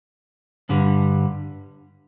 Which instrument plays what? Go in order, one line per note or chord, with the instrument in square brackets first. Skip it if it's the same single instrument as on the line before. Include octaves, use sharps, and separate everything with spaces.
[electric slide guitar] G2 D3 G3